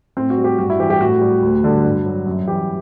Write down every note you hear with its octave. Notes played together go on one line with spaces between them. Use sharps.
A2 C4
F#4
G3
G4
G2 F#4
E4
E3 G3 G4
G4
A2 F#4
G3
D2
D3 G3
G2
F#3
F#2
E3 G3 G4